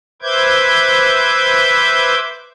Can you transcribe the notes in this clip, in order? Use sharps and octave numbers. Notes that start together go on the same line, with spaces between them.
B4 C5 E5 D6 G6 G#6